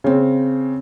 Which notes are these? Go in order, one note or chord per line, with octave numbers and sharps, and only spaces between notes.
C#3 C4